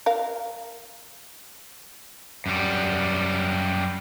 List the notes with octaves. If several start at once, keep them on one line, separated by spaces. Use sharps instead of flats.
A#4 F5
F#2 G3